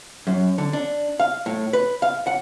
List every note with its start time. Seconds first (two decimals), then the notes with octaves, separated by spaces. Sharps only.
0.27 F#2
0.58 D3
0.73 D4
1.20 F5
1.46 A2
1.73 B4
2.02 F5
2.27 F#5